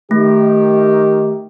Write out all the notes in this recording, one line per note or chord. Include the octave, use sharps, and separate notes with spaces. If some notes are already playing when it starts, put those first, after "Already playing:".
D#3 A3 G4